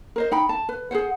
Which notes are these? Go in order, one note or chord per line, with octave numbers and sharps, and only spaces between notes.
A#4 C5 D#5
D#4 G5 B5
A5
B4
G#4 A#4 C5 F#5